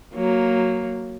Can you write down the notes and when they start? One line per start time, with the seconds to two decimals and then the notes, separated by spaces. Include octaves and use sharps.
0.14 F#3 A#3